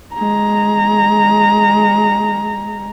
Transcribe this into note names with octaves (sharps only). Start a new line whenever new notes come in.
G#3 A#5